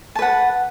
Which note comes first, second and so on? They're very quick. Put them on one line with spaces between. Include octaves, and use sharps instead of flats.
A5 B4 F#5